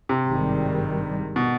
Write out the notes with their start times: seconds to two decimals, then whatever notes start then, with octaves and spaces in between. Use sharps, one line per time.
0.09 C3
0.27 G#1 G2 D#3 G3
1.36 B2